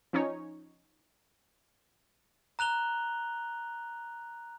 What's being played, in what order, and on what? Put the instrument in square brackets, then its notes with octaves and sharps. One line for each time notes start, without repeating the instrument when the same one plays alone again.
[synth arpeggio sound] F3 C#4 D#4 C#5
[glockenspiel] A#5 F#6 F7 G7